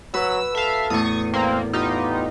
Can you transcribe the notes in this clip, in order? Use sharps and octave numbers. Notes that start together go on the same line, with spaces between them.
F#3 F#4 B4 E6
A4 E5 F5
E2 A2 C#6 D#6
A#3 C4
B3 D#4 F4 G4